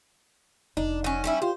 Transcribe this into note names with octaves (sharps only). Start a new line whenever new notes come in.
F1 D4 D#4
F#3 C#4
G3 C#4 E4
F4 G4 C5